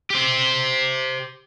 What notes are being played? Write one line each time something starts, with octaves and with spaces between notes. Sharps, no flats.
G4 C5